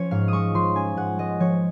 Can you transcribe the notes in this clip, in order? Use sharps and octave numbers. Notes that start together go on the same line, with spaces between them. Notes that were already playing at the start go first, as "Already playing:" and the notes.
Already playing: F3 C#4 C#5
G#2 F5
G#3 C#6 D#6
F3 C6
C#4 G#5
G#2 F#5
G#3 D#5
F3 C#5